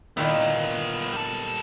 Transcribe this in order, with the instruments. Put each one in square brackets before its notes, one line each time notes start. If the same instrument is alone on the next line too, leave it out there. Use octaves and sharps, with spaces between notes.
[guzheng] A#2 D#3 E4 [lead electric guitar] B3 F4
[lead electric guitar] G3 A4